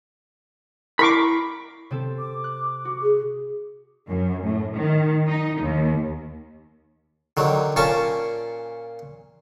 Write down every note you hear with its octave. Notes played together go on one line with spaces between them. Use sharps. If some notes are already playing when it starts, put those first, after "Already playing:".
E4 A#4 B5 C#6 D6 C7
C3 C4 A4
D6
F#6
F#4
G#4
F#2
A2
D#3
D#4
D#2
D3 D#3 F#3
A#2 A#3 C#4 A5 C#6